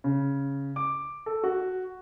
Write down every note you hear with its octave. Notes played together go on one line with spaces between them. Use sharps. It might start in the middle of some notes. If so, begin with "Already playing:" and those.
C#3
D6
A4
F#4